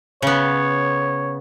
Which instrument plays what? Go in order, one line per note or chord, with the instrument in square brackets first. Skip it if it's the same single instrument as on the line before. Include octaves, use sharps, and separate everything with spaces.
[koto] C#3 B3 [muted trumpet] C#5